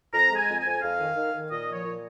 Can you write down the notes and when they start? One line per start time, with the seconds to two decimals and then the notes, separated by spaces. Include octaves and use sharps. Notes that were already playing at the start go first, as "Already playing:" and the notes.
0.14 F2 A#5
0.31 G#3 G#5
0.48 F2
0.59 G#5
0.65 F2
0.82 F2 F5
0.99 D#3
1.16 D#3
1.33 D#3
1.50 A#2 D#5
1.67 F3
1.73 C#5
1.84 A#2